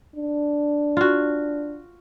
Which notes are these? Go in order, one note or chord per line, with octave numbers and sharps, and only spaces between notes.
D4
F4 F#4